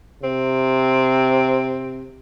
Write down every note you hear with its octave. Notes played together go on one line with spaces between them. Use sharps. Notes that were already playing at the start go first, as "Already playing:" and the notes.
C3 C4